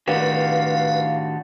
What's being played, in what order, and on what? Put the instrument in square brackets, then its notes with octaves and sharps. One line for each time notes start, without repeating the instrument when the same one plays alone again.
[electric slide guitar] A2 D#3 A#4 [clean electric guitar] D4 F#4 G4 [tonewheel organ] B4 [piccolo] F5